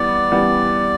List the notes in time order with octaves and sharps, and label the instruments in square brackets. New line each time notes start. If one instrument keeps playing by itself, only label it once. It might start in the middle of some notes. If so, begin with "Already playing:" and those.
Already playing: [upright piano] E3 G3 B3 [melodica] D5
[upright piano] E3 G3 B3